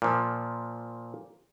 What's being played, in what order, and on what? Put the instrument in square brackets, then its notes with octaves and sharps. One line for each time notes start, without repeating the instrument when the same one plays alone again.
[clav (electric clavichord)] A#2 F3